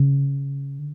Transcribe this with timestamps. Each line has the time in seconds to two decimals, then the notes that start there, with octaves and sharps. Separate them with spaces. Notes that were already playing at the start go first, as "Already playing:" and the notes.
Already playing: C#3
0.79 D3